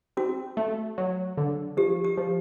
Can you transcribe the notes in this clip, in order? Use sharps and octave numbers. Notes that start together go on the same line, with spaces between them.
C4 F#4
A3
F#3
D3
F3 G4
G4
F3